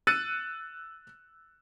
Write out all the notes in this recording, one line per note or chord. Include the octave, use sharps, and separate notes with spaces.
E6 F#6 A6 C#7 D#7